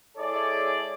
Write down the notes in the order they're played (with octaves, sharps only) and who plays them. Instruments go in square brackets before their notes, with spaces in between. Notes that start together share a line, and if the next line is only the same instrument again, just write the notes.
[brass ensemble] G#3 E4 G#4 A4 C#5 D5